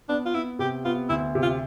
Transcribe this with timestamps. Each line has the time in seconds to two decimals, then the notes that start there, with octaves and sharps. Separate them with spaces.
0.09 B3 D4
0.26 F4
0.34 B3 E4
0.59 C3 G4
0.85 B3 F4
1.09 D2 E4
1.35 C3
1.43 F4